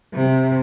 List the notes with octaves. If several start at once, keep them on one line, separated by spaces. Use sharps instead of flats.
C3